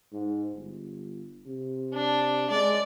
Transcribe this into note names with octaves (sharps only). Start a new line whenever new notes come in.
G#2
G1
C3
D4
G#3 D5